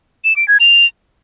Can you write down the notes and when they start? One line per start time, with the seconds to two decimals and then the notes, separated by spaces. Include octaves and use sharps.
0.25 E7
0.36 D7
0.48 G#6
0.60 F7